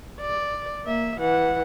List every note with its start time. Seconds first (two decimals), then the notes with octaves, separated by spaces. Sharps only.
0.21 D5
0.85 A#3 E5
1.19 E3 F#5